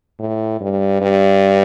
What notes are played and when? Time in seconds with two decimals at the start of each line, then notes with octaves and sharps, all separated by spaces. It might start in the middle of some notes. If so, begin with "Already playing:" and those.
0.19 A2
0.60 G2
1.02 G2